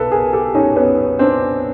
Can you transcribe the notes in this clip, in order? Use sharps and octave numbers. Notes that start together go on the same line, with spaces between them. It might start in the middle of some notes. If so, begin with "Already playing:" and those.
Already playing: B1 A4 B4
G#4 A#4
G4 A4
C#4 D#4
B3 C#4
C4 D4